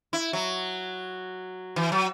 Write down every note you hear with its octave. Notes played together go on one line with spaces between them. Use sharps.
E4
F#3
E3
F#3